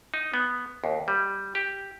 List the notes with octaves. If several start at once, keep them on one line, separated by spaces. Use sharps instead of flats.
D#4
B3
D#2
G3
G4